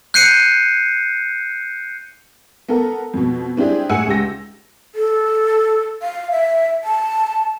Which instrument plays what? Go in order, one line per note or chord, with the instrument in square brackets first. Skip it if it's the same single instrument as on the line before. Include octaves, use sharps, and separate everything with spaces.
[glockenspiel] F#6 G6 C7 C#7 D#7
[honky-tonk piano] B3 A4 A#4
F2 B2
C4 D4 E4 G4 G#4
A2 G#4 F#5 G#5 E6 C#7
C#2 G4 A#6
[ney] A4
F5
E5
A5